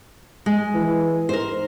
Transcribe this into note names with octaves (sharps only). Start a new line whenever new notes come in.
G#3
E3
G#2 A#4 C5